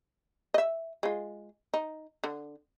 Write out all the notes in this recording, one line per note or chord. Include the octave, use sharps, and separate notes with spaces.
D#5 E5
G#3 F4
D#4
D3